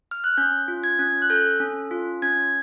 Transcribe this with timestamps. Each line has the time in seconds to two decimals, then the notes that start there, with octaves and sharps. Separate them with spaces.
0.11 F6
0.24 F#6
0.38 C#4 G6
0.68 F4
0.84 G#6
0.99 C#4
1.22 F#6
1.30 A4 G6
1.60 C#4
1.91 F4
2.22 C#4 G#6